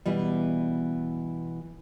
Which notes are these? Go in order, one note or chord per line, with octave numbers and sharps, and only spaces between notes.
B2 E3 G3